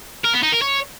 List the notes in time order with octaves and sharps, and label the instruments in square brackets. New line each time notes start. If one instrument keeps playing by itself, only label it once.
[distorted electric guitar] A#4
B3
D#4
A#4
C#5